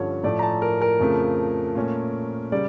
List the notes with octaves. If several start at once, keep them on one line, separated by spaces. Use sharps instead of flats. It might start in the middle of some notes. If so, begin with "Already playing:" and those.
Already playing: G2 D3 F3 C#4 A4 C#5
A2 F3 A3 D5
A#5
A5
A#4
A#4
F2 C#3 F3 A3
A#2 A3 C#4
C#3 G3 D5